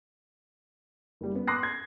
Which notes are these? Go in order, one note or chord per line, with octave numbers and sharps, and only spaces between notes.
F#1 G3
B3
C6 D6 D#6 F#6 A#6 C7
G#6